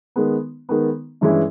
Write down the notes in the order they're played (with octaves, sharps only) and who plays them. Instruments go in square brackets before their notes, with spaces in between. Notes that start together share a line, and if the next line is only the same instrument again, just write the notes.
[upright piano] D#3 G#3 B3
D#3 G#3 B3
G2 E3 G#3 C#4 E4